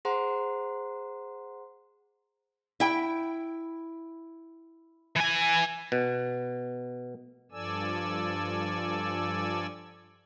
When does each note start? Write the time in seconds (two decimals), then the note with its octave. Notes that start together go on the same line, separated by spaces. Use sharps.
0.05 G#4 C5 F#5 A#5 C6
2.80 E4 G5
5.16 E3 G#5
5.92 B2
7.51 G2 F3 A4 D5 G#5 E6